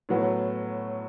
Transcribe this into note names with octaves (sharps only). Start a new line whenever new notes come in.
A2 F#3 B3